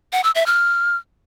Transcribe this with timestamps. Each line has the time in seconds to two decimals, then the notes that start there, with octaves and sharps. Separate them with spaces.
0.13 F#5
0.24 E6
0.35 E5
0.46 F6